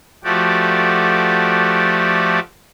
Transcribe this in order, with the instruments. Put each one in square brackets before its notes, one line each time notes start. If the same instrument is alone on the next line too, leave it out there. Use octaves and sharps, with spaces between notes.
[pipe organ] F3 A3 F#4 G4 D5